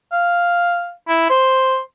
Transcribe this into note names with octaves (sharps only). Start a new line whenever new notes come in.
F5
E4
C5